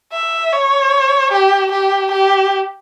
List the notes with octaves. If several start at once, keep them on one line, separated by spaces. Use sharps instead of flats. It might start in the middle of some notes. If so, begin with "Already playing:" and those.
E5
C#5
G4
G4
G4